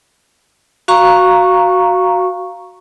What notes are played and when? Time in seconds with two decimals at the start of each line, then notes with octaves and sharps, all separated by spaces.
0.88 F#4 F5 A#5 C#6